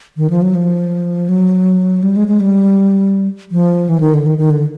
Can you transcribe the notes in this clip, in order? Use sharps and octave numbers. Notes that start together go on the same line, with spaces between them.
D#3
F3
F#3
F3
F#3
G3
G#3
G#3
G3
F3
E3
D#3
D3
D#3
D#3
D3